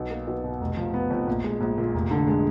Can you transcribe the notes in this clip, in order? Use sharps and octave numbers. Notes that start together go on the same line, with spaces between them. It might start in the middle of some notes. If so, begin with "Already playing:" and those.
Already playing: B1
A#3
B1
B2
F1
F3
B3
F2
A#1
G#3
A#1
A#2
F1
D3
G#3